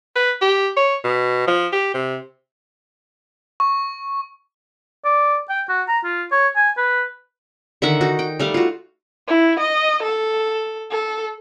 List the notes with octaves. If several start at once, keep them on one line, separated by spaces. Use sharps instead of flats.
B4
G4
C#5
B2
F3
G4
C3
C#6
D5
G5
F#4
A#5
F4
C#5
G#5
B4
D3 D#3 E5 F#5
D#4 F#4
G5
G3 A3 F5 F#5
F4 F#4
E4
D#5
A4
A4